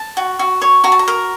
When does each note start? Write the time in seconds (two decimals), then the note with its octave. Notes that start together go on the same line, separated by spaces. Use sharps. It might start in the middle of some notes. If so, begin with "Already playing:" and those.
Already playing: A5
0.17 F#4
0.39 F#4
0.62 C#5
0.84 F#4 A#5
0.92 A5
0.99 A#5
1.08 A#4